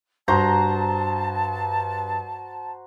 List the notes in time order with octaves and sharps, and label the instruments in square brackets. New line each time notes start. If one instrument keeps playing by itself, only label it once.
[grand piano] G2 [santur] F#4 C5 A#5 [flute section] A5